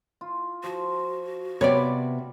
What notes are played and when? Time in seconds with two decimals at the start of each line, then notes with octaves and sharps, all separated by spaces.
0.21 F4
0.63 F3 F#4
1.61 C3 G3 B3 C#5 D5